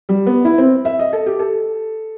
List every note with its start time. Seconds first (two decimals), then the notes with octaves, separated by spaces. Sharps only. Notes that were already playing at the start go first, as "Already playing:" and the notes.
0.09 G3
0.26 B3
0.45 E4
0.58 C4
0.85 E5
0.99 D#5
1.13 A4
1.26 G4
1.39 A4